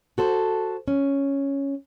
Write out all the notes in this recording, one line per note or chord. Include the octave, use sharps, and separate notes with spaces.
F#4 A4 C5
C#4